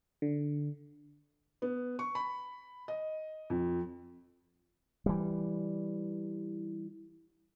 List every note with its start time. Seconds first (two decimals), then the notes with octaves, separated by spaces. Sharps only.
0.22 D3
1.62 B3
1.99 C#6
2.15 B5
2.88 D#5
3.50 F2
5.06 E3 G3